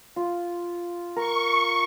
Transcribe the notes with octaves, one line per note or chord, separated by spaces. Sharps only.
F4
A#4 C#6